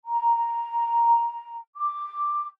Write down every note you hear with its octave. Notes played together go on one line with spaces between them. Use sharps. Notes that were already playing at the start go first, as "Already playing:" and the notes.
A#5
D6